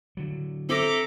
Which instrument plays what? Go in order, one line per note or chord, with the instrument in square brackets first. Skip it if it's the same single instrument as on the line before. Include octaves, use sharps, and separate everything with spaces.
[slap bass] D3 F#3
[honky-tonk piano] C4 [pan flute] A4 [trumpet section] E5 A#5 D6